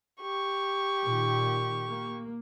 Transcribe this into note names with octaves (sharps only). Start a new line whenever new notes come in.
G4 C#6
A#2 D#3
A#3